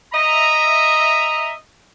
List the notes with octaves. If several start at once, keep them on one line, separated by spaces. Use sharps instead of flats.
D#5 E5 A#5